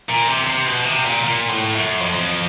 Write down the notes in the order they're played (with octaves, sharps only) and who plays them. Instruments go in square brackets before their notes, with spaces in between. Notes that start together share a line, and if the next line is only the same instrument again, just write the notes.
[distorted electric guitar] A#2
C3
C3
B2
C3
A#2
A#2
A2
F#2
F2